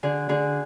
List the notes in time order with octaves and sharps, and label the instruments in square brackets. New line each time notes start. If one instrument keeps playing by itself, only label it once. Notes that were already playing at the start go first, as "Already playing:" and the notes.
[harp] D3 G#4
D3 G#4